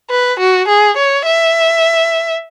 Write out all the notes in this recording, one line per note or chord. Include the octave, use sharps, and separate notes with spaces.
B4
F#4
G#4
C#5
E5